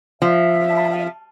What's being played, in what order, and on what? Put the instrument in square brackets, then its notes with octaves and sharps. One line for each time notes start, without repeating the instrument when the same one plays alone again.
[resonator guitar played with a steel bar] F3 [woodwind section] E5